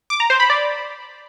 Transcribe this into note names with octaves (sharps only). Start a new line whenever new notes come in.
D6
A#5
C5
B5
D5